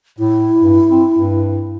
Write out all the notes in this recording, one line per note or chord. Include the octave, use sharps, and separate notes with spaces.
A2 E4
G2
C4
G2